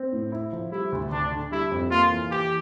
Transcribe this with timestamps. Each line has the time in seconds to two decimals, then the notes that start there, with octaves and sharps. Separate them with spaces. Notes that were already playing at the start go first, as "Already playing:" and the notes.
Already playing: C4
0.12 A2
0.32 E4
0.53 F3
0.72 G3 E4
0.92 D2
1.11 D2 D4
1.32 D3
1.51 G3 E4
1.71 F2
1.91 A#3 F4
2.10 E3
2.30 E3 G4